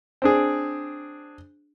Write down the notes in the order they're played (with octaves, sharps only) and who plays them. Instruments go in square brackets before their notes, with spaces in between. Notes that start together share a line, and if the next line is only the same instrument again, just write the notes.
[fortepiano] C4 D4 G#4